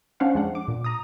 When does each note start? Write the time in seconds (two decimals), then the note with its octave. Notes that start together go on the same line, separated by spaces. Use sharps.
0.20 C#4 D4 C5 F5 F#5
0.34 F2 G#3 D4 F#5
0.55 D6
0.68 A#2
0.84 A#5 D#6